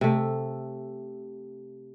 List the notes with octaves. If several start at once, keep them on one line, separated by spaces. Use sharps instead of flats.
C3 A3